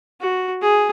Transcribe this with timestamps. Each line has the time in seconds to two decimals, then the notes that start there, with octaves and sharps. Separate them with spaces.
0.21 F#4
0.62 G#4